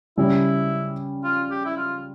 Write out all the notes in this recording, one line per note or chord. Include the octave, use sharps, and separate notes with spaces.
C#3 G3 C#4 E4 G4
F4
G4
E4
F4